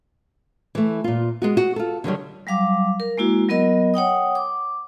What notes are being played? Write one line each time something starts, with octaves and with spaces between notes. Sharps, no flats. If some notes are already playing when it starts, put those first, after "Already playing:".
E3 A3
A#2 F4
G#3 B3 F#4
F#4
F4 A4
D3 D#3 F#3 G3
F#3 G3 F5 D6
A#4
G#3 A#3 E4 F#4
F#3 B3 A#4 D#5
C#5 F#5 G5 D#6
D6